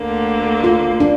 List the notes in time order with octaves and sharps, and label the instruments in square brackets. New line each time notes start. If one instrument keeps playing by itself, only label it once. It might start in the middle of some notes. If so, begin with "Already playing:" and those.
Already playing: [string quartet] D2 D3 A#3
[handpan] F4
D4